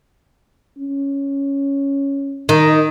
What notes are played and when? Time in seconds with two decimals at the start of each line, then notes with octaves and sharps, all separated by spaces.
0.78 C#4
2.49 D#3